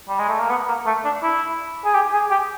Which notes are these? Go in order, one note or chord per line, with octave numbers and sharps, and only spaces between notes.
G3
G#3
A3
A#3
B3
A#3
A3
D4
E4
G#4
G4
G#4
G4